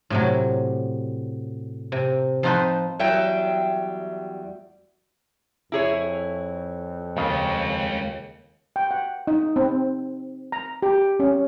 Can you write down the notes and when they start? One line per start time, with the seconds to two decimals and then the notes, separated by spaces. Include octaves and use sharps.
0.10 A2 C3 F#3
1.92 C3
2.43 F3 C4 D#4 F4 B4 C5
2.99 E2 F#3 G3 E5 G5
5.72 F2 E4 G#4 C#5
7.17 D#2 C#3 G#3 F4
8.76 G5
8.91 F#5
9.27 D#4
9.56 C4
10.52 A#5
10.82 G4
11.20 C#4